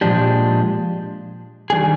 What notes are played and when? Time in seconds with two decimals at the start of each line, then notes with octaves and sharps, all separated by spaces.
0.01 A#2 F3 G#3 D4 G4
1.70 D#3 G3 D4 G#4